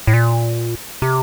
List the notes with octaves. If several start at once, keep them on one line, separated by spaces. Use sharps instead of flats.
A2
A#2
C3